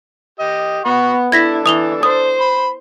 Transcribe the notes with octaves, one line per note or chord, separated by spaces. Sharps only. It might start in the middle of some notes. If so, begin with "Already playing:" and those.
G4 D#5
B3 F#5 B5 C#6
D4 E4 A4 G#6 A#6 B6
E3 D#6 F7 G7
C5 D#6
B5